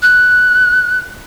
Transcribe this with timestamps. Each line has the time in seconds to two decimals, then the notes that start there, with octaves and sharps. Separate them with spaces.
0.02 F#6